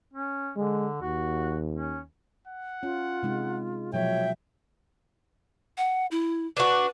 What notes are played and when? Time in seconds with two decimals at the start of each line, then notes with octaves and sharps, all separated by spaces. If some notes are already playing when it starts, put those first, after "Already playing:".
0.14 C#4
0.57 D3 G#3
1.02 D#2 F#4
1.73 C#4
2.48 F#5
2.83 C#4 F4
3.23 C3 G#3 D#4
3.93 B2 F3 F#3 C#5 E5 G5
5.77 F#5
6.11 E4
6.57 D4 F#4 B4